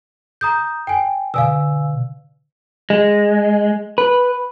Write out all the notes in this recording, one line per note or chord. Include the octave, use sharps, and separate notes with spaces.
A#5 D#6 G6
G5 G#5
B2 D3 F5 G#5 E6
G#3
B4